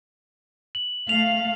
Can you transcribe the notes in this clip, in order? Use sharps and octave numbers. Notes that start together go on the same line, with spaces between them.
F#7
A3 F5 F7